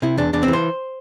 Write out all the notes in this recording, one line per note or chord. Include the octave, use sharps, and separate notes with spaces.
C3 E4
E2 D4
E2 D4
C4
E3
C5